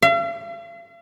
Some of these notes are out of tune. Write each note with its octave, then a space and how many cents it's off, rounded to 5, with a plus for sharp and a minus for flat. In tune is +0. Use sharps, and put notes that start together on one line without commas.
F5 -45